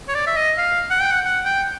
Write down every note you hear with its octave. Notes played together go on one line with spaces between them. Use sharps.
C#5
D5
E5
D#5
F5
F#5
G5
F#5
F#5
G5